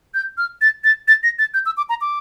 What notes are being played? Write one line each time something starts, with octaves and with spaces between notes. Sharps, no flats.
G6
F6
A6
A6
A6
A#6
A6
G6
E6
D6
A#5
D6